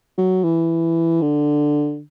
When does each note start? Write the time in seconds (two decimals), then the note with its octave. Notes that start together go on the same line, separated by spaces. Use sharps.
0.18 F#3
0.44 E3
1.22 D3